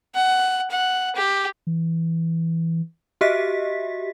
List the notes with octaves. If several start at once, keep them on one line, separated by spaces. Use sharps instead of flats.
F#5
F#5
G4
E3
F#4 G4 D#5 E5 B6